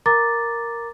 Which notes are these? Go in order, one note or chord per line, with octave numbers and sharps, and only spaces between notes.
A#4 A#5 D6 A6